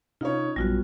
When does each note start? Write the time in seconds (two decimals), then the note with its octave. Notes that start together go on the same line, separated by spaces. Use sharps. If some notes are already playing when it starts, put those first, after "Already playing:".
0.21 C3 C#4 D#4 F4 C#5 F5
0.56 A#1 F#2 B2 G3 F4 F#4